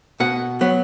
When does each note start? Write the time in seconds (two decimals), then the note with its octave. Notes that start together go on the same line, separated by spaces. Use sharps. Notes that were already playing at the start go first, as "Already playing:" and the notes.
0.20 B2 F#5
0.61 F#3 B3